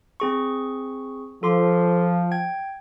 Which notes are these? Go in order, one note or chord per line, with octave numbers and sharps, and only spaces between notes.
C4 G#4 C#6
F3 A4 C6 D6
G5 G#6